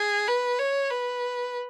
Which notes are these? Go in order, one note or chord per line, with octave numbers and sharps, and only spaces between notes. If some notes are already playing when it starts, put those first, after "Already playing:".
Already playing: G#4
B4
C#5
B4